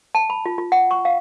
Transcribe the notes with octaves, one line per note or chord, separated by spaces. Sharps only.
A5
B5
F4
F4
F#5
C#6
F5